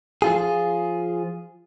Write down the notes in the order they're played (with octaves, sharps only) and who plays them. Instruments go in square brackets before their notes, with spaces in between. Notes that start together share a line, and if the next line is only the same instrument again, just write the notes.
[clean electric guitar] F3 F4 G#4